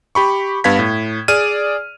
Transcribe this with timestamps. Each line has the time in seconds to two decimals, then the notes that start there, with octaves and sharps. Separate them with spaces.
0.15 G4 B5 C#6
0.64 G2 B3 B4 F5 G#6 B6
0.79 A2
1.28 G#4 D5 F6 D#7